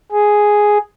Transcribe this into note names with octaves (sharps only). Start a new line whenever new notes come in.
G#4